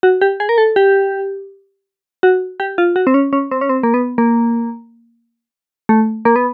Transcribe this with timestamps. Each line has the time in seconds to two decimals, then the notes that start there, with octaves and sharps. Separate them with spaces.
0.03 F#4
0.21 G4
0.40 G#4
0.49 A#4
0.58 A4
0.76 G4
2.23 F#4
2.60 G4
2.78 F4
2.96 F#4
3.07 C4
3.14 C#4
3.33 C#4
3.51 C4
3.61 C#4
3.69 C4
3.83 A#3
3.94 B3
4.18 A#3
5.89 A3
6.25 A#3
6.36 B3